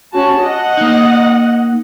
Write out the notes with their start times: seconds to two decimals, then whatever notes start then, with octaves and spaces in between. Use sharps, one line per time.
0.13 C#4 F#4 A5
0.43 D#5 F#5
0.77 A#3 D#4